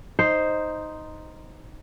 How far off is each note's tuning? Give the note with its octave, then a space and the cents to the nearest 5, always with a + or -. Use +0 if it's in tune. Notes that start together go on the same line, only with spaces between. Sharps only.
D#4 +0 C5 +0